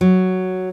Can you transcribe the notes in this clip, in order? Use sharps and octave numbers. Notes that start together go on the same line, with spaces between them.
F#3